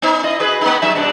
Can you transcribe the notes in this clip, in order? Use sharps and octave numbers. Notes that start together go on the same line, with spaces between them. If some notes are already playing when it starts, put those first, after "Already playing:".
B3 D#4
E4 D#5
F#4 G#4 B4
A#3 B3 D#4
F#3 D#4 E5
G2 B2 D4